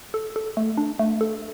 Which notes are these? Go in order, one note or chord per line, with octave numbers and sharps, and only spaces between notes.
A4
A4
A3
D4
A3
A4